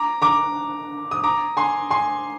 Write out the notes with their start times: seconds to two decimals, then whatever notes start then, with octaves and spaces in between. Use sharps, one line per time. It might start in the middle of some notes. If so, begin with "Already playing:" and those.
Already playing: A#5 D6
0.22 A#5 D6
1.11 D#6
1.24 A#5 D6
1.57 G#5 C6
1.90 G#5 C6